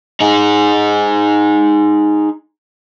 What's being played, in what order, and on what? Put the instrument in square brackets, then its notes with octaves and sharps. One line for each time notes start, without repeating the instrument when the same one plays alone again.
[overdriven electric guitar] D#4 G#4